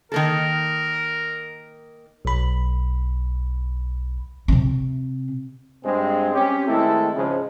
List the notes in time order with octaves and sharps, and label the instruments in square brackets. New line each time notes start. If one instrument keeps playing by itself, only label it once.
[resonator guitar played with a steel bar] D#3 A#3 A4 [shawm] A#4
[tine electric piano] B1 B5
[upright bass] C3 C4
[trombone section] G2 G#3 C4
C4 C#4 G4
D#3 G#3 A3 C4 E4 A4
G#2 C#3 F3